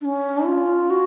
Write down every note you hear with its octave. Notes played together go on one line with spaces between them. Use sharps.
D4
C#4
F4
F#4